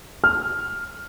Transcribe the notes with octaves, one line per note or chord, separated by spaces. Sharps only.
F6